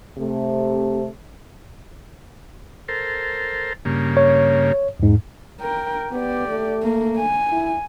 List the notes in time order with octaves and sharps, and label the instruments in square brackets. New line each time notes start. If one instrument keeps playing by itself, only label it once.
[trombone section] C3 A3
[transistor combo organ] A4 A#4 C5
G2 C#3 A#3
[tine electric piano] C#5
E2 G#2
[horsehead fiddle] A#4 G5
[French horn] B3 [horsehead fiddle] G4 D5
[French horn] A3
[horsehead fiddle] A#3
G#5
[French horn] E4